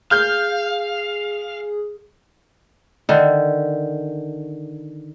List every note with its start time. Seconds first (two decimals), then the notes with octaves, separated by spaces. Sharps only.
0.11 G#4 F5 F6 G6
3.09 D3 D#3